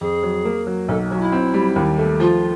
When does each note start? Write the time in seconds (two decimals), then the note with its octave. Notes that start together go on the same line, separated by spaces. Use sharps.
0.01 F2 G#4
0.23 F#3
0.45 A#3
0.67 F#3
0.88 B1 A4
1.11 F#3 F#4
1.21 E4
1.32 C4
1.54 G3
1.76 D#2
1.98 A3
2.20 F3 F4